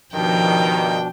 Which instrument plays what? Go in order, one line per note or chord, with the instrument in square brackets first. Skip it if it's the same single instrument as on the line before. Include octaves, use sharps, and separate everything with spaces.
[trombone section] G2 D#3 [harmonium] B2 D4 [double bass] F3 [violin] G5